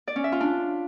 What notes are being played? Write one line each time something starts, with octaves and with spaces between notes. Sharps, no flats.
D5
C#4
E5
F4
D4